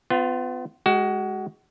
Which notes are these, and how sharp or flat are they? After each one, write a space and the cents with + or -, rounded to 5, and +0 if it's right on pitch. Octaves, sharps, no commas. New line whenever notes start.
B3 +35 F4 +0
G#3 +0 F#4 +25 G5 +0